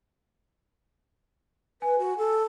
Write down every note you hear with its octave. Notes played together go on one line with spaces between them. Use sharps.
B4 G#5
F#4
A4